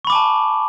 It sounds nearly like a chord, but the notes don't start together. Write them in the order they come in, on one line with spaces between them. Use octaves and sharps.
C#6 B5 D6 G#5 A5